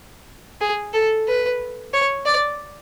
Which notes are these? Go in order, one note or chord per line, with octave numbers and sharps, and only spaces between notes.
G#4
A4
B4
C#5
D5